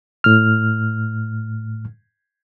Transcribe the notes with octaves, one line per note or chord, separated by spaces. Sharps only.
A2 F6